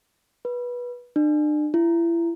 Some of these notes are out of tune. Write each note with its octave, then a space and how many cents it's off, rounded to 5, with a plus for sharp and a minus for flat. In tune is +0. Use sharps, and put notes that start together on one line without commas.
B4 -20
D4 +40
E4 +35